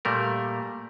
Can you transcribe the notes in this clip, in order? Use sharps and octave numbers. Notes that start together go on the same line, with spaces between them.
A#2 G3 A3 A#4